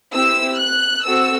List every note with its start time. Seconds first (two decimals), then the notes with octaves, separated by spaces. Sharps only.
0.13 C4 E4 G4 E6
0.58 F#6
1.03 C4 F#4 A4 E6